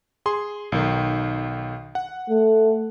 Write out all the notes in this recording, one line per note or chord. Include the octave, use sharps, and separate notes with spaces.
G#4 C6
B1 D#3
F#5
A3